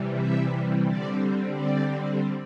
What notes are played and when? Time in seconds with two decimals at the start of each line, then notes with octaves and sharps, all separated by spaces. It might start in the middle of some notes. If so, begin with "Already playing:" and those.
Already playing: C3 E3 G3
0.16 E5
0.85 D3 G3 C4 D5
1.55 D5